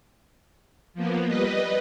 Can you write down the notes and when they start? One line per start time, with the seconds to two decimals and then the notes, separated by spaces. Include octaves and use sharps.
0.94 F3 A#3 B3
1.26 G3 B4 D#5